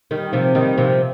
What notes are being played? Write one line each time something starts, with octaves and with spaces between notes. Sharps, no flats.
D#3 G3
C3 F3
D#3 G3
C3 F3